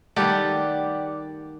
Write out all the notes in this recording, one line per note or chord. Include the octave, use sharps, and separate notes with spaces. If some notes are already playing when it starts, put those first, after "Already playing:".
D#3 G3 A3 G4 D5 F#5